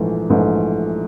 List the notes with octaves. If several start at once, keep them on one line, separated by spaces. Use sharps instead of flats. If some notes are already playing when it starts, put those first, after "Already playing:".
Already playing: A#1 G#2 E3 A3
A#1 G#2 E3 A3